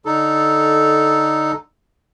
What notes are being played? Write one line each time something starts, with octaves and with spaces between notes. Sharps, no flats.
D3 D#4 A4